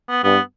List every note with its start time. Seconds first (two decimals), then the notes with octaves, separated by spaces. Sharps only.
0.09 B3
0.24 G2 B3